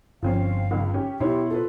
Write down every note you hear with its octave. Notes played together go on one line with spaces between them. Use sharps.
G1 F3 C4 C#4 F5
C#2
C#4 G4
B2 E4 G4 C#5 C6
F4 A4 B4